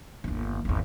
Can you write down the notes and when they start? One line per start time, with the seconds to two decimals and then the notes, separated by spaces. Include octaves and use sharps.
0.24 G1 D#2
0.65 G#1 E2